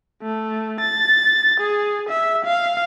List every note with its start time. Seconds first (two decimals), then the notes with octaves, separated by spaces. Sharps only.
0.23 A3
0.80 A6
1.60 G#4
2.09 E5
2.45 F5